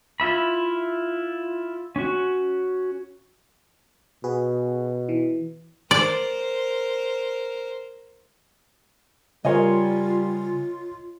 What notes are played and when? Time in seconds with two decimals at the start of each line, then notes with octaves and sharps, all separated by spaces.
0.20 E4 F4 E5 B5
1.96 C#4 F#4
4.24 B2 F#4 G#4 B4
5.09 E3
5.91 A#4 C5 D5
9.45 C#3 G3 F4 A#4 C#5 D#5 G#5 C6